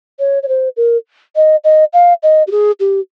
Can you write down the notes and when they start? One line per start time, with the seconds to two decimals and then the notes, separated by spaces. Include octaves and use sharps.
0.19 C#5
0.43 C#5
0.48 C5
0.77 A#4
1.36 D#5
1.64 D#5
1.93 F5
2.23 D#5
2.47 G4
2.51 G#4
2.80 G4